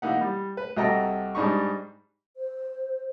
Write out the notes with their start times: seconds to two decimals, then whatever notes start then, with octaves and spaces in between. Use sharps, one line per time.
0.02 E3 A#3 D#4 F#5
0.21 G3
0.57 B4
0.76 C2 F#4 A4 D#5 G5 A#5
1.35 G#2 G3 D4 D#4 C#6
2.37 C5